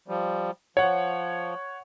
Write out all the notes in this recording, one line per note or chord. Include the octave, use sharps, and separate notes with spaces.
F3 G3
F3 C#5 F#5